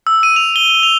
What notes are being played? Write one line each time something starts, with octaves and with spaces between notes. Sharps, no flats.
E6
D#7
F7
G7
G7
F7